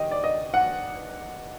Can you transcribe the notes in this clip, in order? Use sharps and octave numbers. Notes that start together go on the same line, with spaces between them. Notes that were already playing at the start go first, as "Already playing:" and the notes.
Already playing: D#3 G3 D#5 G5
D5
D#5
F#5